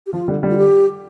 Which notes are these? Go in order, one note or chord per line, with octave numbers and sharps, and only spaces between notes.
G4
F3 F4
D3 G3
D3 G3
F4
G4